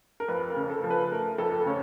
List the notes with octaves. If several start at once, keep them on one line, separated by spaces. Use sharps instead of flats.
A#4
F2 B4
A#4
C#3
A4
F3
B4
A3 A#4
F2 A4
C#3 C#5